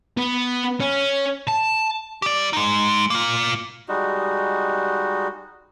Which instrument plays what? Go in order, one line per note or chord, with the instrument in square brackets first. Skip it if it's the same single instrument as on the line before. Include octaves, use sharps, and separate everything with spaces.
[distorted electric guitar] B3
C#4
A5
[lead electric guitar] G4 D5
G#3 D#4
A#3 F4
[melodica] G3 G#3 D#4 F#4